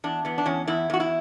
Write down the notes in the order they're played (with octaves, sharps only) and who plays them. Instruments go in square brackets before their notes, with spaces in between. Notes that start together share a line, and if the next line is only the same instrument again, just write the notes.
[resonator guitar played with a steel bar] E2 D4
E2 B3
D4
E2 C#4
E2 E4
E2 F#4
E4